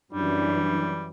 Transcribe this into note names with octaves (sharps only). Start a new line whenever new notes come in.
F#2 E3 G3 D4